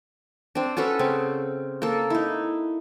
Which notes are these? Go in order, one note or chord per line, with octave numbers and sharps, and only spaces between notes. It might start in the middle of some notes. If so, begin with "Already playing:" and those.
C4 D4
C#4 F#4 A4 B4
C#3 C4
A#3 A4
D#4 E4